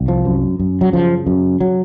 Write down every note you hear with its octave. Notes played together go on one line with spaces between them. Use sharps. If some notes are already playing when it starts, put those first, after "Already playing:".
Already playing: C2
F3
F#2
F#2
F#3
C#3 F3
F#2
F#3